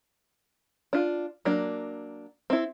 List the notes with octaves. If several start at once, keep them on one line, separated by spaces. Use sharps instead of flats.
D4 F4
F#3 A#3 D4
C4 E4